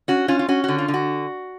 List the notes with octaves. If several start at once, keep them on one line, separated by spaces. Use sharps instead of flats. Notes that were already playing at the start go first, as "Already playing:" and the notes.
C#4 F#4
C#4 F4
F4
C#4 F#4
D3 F#4
F4
D3
F#4